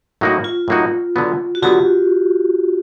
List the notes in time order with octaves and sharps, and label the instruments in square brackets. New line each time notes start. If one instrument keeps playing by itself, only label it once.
[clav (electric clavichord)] A2 F#3 A#3 D#4 F#4
[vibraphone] F4
[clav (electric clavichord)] A2 F#3 A#3 D#4 F#4
D3 F#3 B3
[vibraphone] F#4
[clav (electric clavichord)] D3 F#3 B3 [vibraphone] F4 G4